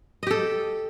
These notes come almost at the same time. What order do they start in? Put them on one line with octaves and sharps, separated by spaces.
D#5 G4 A4